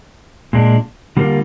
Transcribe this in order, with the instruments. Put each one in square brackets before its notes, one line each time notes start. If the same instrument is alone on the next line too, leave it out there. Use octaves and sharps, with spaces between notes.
[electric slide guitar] A#2 G#3 D4
D3 G3 A#3 F4